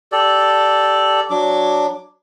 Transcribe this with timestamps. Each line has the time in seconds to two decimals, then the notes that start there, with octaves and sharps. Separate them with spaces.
0.12 G4 A4 D5
1.30 F#3 D4 D6